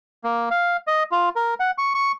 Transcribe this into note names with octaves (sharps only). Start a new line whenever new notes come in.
A#3
F5
D#5
F4
A#4
F#5
C#6
C#6